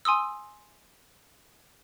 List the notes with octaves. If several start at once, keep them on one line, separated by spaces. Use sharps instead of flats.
G#5 C6 D#6 E6